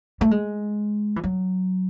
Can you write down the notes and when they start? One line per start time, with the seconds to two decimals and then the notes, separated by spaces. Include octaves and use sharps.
0.21 A3
0.31 G#3
1.16 E3
1.24 F#3